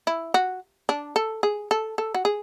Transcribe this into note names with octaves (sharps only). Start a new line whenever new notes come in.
E4
F#4
D4
A4
G#4
A4
A4
F#4
G#4